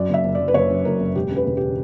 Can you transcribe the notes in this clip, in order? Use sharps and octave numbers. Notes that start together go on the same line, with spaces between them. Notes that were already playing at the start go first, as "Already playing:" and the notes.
Already playing: F#2 D5
F#1 E5
F#1
F#1 D5
B4
F#1 C#5
F#2
F#1 A#4
F#1
E1 G4
C#3
B4
E1
C#3 G4